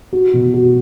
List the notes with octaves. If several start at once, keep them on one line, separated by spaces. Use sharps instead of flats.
F#4
B2
F#4